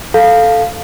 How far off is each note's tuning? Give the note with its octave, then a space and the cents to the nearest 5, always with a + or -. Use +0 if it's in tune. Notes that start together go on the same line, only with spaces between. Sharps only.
A4 +0 F5 +0